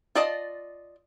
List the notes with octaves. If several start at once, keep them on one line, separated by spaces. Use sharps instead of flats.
F4 D5 D#5 A5